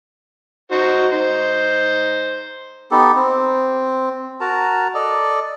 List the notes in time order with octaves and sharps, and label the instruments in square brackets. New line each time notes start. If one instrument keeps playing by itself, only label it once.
[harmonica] D#4 F#4 C5
D#4 C5
[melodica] B3 D#4 G4 A4
C4
F#4 A#4 A5 A#5
A4 D5 D#5